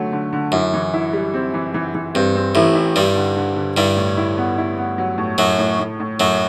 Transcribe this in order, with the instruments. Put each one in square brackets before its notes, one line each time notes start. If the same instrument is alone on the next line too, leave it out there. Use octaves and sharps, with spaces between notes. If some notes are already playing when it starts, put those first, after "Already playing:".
Already playing: [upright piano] D3 F#3 A3
D3
D3
[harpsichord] F#2 [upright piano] E4
[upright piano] E3
E4
G3
C4
E3
E3
E3
[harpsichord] G2 [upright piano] C4
[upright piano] C4
[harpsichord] A1 A2 [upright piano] E4
[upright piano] E4
[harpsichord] G2 G3 [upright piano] E4
[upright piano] D3
D3
D3
[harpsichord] G2 G3 [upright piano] E4
[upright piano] A2
E4
B3
E4
B3
F#3
A2
[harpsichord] F#2 F#3 [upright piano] A2
[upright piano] A2
A2
A2
[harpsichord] F#2 F#3 [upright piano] A2